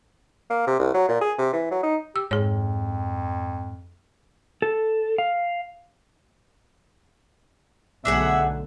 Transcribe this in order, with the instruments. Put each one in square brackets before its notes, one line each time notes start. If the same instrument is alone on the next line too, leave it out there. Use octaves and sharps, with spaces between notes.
[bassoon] A#3
C3
C2
F#3
A#2
G#4
C3
E3
F#3
D#4
[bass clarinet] G4 [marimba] E6
[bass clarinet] F2 [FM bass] G#2 [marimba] G#4 C#5
[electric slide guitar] A4
F5
[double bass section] B1 D3 A3 [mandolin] D4 G#4 F#5 [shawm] E5